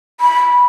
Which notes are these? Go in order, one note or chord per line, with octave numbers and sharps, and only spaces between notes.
B5